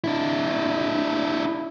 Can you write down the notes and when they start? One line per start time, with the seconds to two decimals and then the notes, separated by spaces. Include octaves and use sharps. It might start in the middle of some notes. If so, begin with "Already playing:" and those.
0.04 D4 E4